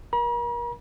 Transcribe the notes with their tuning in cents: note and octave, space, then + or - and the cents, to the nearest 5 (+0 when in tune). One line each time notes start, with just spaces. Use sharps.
A#4 +30 A#5 +45